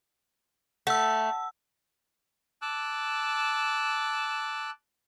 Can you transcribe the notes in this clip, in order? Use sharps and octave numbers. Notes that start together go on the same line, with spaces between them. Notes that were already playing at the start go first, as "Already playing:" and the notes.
A3 F#5 E6
A5 D6 E6 F#6